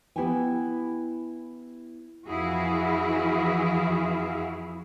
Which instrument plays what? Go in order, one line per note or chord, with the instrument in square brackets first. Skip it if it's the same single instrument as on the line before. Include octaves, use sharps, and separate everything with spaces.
[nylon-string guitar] B3 E4 G4 G5 G#5
[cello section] F2 E3 E4 F#4 G#4 F5